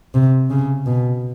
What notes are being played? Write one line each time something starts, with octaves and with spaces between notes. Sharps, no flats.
C3
C#3
B2